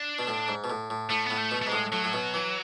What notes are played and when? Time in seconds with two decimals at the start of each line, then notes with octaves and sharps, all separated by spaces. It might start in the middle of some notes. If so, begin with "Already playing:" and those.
Already playing: D4
0.19 B2
0.27 A2
0.48 G#2
0.64 B2
0.70 A2
0.90 A2
1.10 A2 A3
1.26 A2 B3
1.38 A3
1.51 B2
1.61 A3
1.66 G#2 G#3
1.72 A2
1.92 A2 F#3
2.04 A2
2.13 B2
2.34 E3